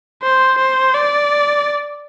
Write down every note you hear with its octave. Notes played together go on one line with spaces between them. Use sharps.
C5
C5
D5